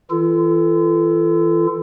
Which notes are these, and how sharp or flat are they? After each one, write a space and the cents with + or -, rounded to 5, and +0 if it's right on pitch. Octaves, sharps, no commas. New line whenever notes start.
E3 -15 F4 -40 A4 +0